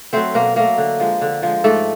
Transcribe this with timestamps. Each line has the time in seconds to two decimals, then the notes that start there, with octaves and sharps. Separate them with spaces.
0.13 F#3 A3 C4 C5
0.34 B2 A#3 A#4
0.56 F#3 A3 A#3 A#4
0.78 D3
1.00 F3 G#3
1.21 D3
1.43 F3 G#3
1.64 G#2 A3 A4